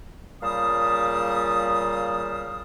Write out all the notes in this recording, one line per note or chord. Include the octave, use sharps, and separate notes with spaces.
A#2 C#3 G3 F5 A5 D#6